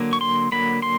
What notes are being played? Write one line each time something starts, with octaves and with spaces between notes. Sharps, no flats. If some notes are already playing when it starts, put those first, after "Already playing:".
Already playing: D3 F#3 A#3
C#6
C6
D3 F#3 A#3 B5
C6